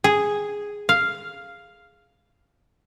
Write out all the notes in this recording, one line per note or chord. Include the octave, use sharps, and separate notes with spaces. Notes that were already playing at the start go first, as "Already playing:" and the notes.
G#4
F5